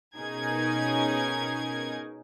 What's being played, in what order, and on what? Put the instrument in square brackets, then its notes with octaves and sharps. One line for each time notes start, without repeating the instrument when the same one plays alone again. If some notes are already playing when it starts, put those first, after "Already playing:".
[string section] B2 C#4 D#4 G#4 A#4 G#6